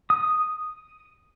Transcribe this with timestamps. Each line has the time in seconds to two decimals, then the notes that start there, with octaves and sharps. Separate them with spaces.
0.10 D#6